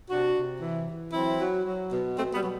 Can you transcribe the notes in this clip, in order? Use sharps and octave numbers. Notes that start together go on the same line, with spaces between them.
C3 D4 F#4
C3
E3
E3
F#3 C4 E4
F#3
F#3
B2
B2 A3 C4
G3 B3
F#3